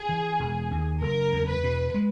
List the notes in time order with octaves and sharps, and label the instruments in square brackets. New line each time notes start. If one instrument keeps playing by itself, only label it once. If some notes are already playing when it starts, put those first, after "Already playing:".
Already playing: [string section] G#4
[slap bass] E3
E1
D#2
[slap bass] F#1 [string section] A#4
[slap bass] E2
[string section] B4
[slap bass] B2
G#3